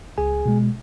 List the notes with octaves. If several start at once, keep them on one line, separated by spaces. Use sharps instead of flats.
C#2 G#4 G#5
B2 G#3